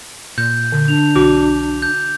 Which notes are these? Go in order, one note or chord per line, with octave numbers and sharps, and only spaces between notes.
A#2 G6
D3
D4 F7
B1 F#4 D6
G6